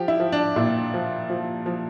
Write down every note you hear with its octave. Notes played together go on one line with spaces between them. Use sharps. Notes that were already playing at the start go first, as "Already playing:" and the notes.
Already playing: F3 G4
E4
F3
D4
A#2 E4
F3
F3
F3